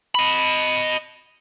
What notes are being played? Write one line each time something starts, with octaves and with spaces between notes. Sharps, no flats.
D#5 B5